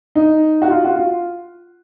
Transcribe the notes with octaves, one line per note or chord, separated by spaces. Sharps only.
D#4
F#4
F4
F#4
F4